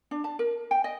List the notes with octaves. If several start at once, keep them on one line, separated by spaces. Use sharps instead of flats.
D4
A5
A#4
G5
D#5